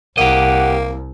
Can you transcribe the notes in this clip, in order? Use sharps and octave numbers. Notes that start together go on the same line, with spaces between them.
C2 A#3 G4 D#5 F#5